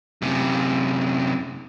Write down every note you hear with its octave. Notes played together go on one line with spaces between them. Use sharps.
F#2 C3